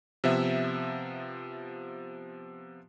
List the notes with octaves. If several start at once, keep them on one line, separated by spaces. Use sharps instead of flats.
C3 F3 B3 E5